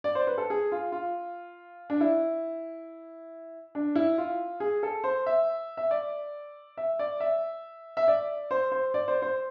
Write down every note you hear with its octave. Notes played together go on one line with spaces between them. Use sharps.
D5
C5
B4
A4
G#4
F4
F4
D4
E4
D4
E4
F4
G#4
A4
C5
E5
E5
D5
E5
D5
E5
E5
D5
C5
C5
D5
C5
C5